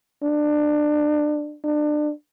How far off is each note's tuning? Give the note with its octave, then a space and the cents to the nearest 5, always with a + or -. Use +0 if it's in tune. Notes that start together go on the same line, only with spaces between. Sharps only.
D4 +25
D4 +30